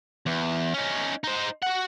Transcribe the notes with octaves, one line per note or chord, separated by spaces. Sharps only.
E2
C#4 D#4
D#4 C5
F#4 F#5